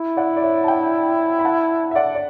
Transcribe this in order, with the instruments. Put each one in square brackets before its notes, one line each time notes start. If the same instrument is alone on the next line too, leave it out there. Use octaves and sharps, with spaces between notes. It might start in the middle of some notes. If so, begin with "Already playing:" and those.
Already playing: [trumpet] E4
[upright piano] D5 F#5
D5
C#5 E5
A5
E5 G5
B5
F#5 A5
E5
D5 F#5
D5